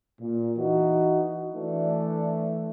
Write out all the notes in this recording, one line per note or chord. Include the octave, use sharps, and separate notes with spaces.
A#2
E3 D#4 F#4
E3 A3 D4